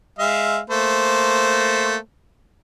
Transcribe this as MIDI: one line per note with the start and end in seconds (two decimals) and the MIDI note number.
0.19 0.59 56
0.19 0.59 76
0.19 0.59 77
0.70 1.96 57
0.70 1.96 58
0.70 1.96 72